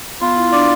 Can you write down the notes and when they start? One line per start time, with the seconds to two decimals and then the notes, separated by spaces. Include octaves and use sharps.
0.21 B3 F4
0.36 E4
0.47 E4
0.52 D4 D5